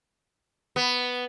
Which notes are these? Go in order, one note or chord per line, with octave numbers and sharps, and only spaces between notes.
B3